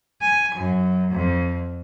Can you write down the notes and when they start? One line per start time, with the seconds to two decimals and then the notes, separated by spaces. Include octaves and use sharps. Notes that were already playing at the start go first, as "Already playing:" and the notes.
0.21 G#5
0.55 F#2
1.12 F2